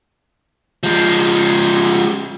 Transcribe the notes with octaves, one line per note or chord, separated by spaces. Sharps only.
F3 G#3